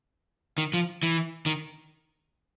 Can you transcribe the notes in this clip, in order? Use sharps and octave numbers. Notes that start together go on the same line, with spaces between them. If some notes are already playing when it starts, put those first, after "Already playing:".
D#3
F3
E3
D#3